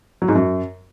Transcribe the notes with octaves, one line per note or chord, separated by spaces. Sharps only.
F#3
G#2
F#2